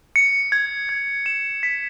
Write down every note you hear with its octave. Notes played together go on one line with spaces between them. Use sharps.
C#7
G#6
G#6
E7
B6